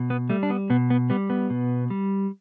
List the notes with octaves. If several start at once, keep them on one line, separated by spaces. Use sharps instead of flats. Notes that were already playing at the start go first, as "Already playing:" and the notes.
Already playing: B2
B3
G3 A3
D4
B3
B2 B3
B3
G3 B3
B3
B2
G3